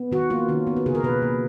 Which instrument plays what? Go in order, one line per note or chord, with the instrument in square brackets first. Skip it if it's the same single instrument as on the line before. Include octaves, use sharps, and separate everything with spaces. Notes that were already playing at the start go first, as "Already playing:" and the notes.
Already playing: [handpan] B3
D#3 F#4
A#3 F4
D#3 C#4
B3
F#4
C#3 G#4
A#4
B2 B4
A#3